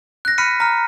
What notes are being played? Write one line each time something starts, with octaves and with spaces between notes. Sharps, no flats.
F#6 A#6
B5 F6 B6 C#7 D#7
A#5 F6